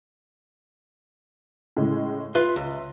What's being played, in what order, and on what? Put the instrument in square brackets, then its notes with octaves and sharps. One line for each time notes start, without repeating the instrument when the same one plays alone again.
[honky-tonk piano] A2 C#3 G#3
[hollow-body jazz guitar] F4 B4 C6 [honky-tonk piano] E5
[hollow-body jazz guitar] C#2